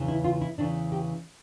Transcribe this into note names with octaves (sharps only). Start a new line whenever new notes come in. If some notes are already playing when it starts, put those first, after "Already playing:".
Already playing: E2 C#3 E3
E4
F4
E4
E2 C#3 E3 D4
G4